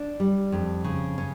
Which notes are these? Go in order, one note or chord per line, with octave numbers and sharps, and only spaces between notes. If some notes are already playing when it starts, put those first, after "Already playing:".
Already playing: D4
G3
F2
C#3
C#4